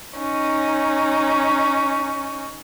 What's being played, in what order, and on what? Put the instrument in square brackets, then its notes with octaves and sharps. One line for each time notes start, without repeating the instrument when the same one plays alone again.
[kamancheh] C#4 D#4